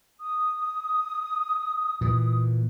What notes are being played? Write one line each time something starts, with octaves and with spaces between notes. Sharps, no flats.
D#6
A#2 E3